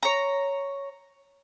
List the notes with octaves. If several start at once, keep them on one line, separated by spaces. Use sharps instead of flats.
C#5 A#5